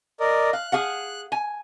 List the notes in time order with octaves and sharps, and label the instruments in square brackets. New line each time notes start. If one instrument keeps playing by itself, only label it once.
[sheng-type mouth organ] A#4 D5 D#5
[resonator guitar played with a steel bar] F5 [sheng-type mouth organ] F#6
[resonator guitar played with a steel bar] G#4 F5 F#5
G#5